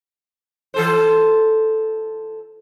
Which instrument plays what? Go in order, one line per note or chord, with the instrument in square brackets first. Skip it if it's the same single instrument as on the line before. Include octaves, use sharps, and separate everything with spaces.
[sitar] E3 A4 C5